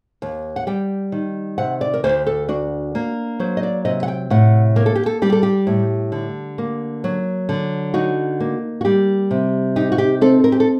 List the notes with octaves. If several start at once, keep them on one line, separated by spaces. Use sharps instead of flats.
D#2
F#5
G3 G5
D#3
C3 F#5
D5
A#4
D2 C5
A4
D4 F#4
A#3
F#3 C5
D#5
D5
C3 D#5
F#5
G5
A2 F#5
A#3 A#4
A4
G4
A4
G3 G4
A4
G4
A2
D3
A#3
F#3
D3
D#4 F#4
A#3
F#4
G3 G4
C3
D#4 G4
F#4
G4
C4 A4
A#4
G4
A4